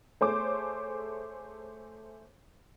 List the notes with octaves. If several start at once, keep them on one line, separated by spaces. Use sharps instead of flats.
A3 G#4 C5 C#5 D6